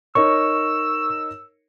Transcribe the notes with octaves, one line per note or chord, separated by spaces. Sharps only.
D#4 A#4 C#5 C#6 E6